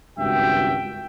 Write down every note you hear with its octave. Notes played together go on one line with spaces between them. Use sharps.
G#1 C#2 G2 F#4 E5 G5